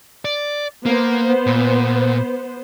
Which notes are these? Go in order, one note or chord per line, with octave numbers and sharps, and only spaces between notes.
D5
A#3 B3 C5
A#2